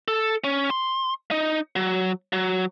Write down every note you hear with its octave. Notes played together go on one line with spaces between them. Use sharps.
A4
C#4
C6
D#4
F#3
F#3